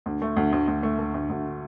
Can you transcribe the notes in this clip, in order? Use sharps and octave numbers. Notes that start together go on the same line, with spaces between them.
D2
A3
D2
D2
D2
A3
A3
D2
D2
D3